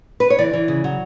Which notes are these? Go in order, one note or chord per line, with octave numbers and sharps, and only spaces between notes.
B4
C#5
E3 D5
E3
C#3
F#3